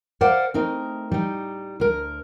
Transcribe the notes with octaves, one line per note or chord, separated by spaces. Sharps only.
A#4 C5 D5 F5 F#5
A3 C4 D#4 A#4
G3 D#4
D2 A#4